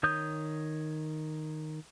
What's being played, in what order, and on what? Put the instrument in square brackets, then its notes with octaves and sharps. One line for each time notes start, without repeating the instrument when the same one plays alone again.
[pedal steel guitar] D#3 C#5 D#6 G6